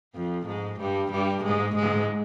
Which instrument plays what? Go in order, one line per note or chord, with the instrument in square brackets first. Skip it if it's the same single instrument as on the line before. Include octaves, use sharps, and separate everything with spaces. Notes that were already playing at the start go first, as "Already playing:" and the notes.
[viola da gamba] F2 F3
G#2 G#3
G2 G3
G2 G3
G#2 G#3
G#2 G#3